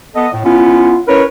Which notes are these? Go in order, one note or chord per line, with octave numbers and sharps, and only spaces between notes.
B3 A4 D#5
A2
B3 C#4 E4 F4
C#4 E4 A#4 B4 C#5